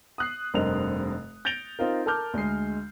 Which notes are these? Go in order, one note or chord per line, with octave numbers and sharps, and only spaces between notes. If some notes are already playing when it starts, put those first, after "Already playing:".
D#6 F#6 C7
F1 G2 C4 A#4 D#5 F7
G6 A6 A#6 D7 F7 G7
C4 D#4 F4 A#4
A4 A#4 A5 D6 F6 G6
D2 G#3 G#4 C7